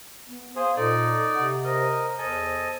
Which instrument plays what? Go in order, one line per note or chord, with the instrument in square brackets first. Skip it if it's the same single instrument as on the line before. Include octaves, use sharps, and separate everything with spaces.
[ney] B3
[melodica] G#4 [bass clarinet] C5 [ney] F5
[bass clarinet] A#2 [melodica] D#4 D5 [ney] A4
[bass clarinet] C3 [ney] F#5
[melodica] A#4 D#5 [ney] C5
[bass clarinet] E2 [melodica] A4 D#5 G#5